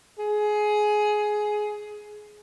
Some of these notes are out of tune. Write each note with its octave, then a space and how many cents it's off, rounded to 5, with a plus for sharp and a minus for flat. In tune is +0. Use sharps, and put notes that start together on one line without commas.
G#4 +15